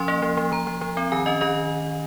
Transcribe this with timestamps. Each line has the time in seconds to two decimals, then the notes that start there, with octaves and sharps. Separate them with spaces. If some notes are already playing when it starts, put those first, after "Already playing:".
Already playing: F3 C#4 C6
0.08 A#3
0.22 F3
0.37 F3
0.52 F3 A#5
0.67 F3
0.81 F3
0.97 C4
1.12 D#3 G#5
1.26 C#4 D#5
1.41 D#3 D#5